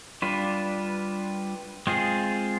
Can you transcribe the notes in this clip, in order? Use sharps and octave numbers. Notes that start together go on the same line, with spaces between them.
G3 D4 F4 B4
G#3 C4 F4 G#4